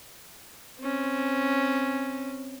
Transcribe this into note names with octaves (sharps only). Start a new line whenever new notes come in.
C4 C#4